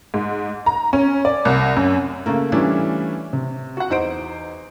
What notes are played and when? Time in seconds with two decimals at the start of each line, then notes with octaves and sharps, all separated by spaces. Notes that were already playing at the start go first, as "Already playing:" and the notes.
0.14 G#2
0.66 A#5
0.93 C#4
1.25 D5
1.45 C2
1.76 F#2
2.26 C#3 A3 A#3
2.52 E3 G3 A3 C#4 D4 E4
3.33 C3
3.77 F#4 F#5
3.90 E2 D#4 C5 D7